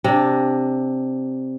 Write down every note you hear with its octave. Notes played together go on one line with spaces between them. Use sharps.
C3 D4